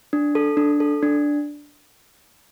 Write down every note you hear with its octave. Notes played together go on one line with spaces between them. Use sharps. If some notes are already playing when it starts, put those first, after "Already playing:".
D4
A4
D4
A4
D4